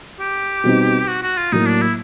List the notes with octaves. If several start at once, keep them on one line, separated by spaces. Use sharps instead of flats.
G4
B2 G3 C4 D#4
F#4
F#4
F4
A2 F#3 A#3 D#4
D4
E4